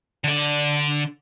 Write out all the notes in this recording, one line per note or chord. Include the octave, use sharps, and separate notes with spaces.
D3 D5